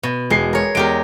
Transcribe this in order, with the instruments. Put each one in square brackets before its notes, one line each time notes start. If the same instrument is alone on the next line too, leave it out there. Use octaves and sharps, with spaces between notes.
[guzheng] B2
[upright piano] E1 C7 [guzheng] G#3
[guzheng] A#4 C#5
[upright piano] E2 D7 [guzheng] G#3 G4 A#4